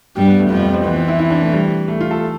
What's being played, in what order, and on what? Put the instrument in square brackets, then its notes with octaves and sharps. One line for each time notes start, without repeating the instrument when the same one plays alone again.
[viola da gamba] G2 G3 [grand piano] G4
[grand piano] B3
A3
[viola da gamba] F2 F3 [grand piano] G3
[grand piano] G3
C4
[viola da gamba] E3 [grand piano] B3
[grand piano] C4
E4
E4
D4
A3
G3
A3
F4
A4